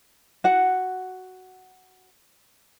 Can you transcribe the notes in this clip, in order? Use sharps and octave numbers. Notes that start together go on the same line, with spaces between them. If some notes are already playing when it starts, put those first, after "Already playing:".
F#4 F#5